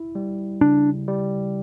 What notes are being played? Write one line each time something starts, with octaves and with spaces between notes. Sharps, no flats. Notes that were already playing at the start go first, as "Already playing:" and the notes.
Already playing: E4
G3
C#3 D4
G3